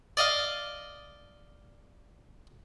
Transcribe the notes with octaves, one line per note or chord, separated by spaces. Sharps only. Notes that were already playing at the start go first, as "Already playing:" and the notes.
D5 D#5 F5